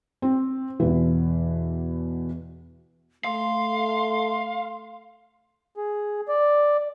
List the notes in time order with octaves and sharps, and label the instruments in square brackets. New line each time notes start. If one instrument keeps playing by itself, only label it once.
[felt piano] C4
E2 B2 E3
[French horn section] A3 [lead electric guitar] F5 [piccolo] C6
[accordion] G#4
D5